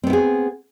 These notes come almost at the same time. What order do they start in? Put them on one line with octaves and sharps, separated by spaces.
C4 B3 E4 G#4